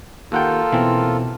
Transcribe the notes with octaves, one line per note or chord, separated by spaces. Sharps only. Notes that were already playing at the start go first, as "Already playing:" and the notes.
D#2 A#3 F4 A4 F#5 G5
B2 E3 C4